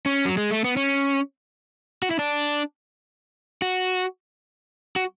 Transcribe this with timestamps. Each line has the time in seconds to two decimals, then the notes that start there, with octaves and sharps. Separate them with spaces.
0.06 C#4
0.25 F#3
0.37 G#3
0.51 A3
0.64 B3
0.77 C#4
2.02 F#4
2.11 E4
2.19 D4
3.62 F#4
4.96 F#4